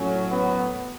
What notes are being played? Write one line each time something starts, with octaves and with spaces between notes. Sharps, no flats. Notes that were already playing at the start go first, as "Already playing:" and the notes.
Already playing: A2 F#3 C#4
B3